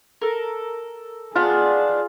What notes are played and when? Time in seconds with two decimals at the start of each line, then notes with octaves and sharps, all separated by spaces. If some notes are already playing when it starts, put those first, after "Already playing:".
0.22 A4 A#4
1.35 B3 D4 D#4 F4 G#4